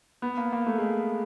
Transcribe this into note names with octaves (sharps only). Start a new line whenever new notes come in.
B3
A#3
A#3
A3
G#3